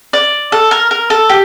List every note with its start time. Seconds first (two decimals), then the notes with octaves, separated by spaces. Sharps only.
0.13 D5
0.52 A4
0.71 A#4
0.91 A#4
1.10 A4
1.29 G4